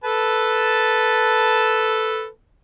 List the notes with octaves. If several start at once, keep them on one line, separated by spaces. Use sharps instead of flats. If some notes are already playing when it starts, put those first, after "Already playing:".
A4 B4 A5